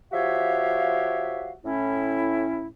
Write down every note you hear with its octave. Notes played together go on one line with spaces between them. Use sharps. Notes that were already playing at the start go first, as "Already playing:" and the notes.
F3 F#4 G4 C#5 E5 F5
A2 C#4 E4